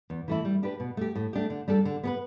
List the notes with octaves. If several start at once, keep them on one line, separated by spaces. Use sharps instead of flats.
E2
E3 A3 E4
G3
D4 G4 B4
B2
A3 G4
A2
A3 D4 G4
D3
G3 D4 A4
D3
B3 G4 B4